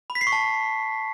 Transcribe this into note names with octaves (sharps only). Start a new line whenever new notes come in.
B5
B6
C7
C#6
A5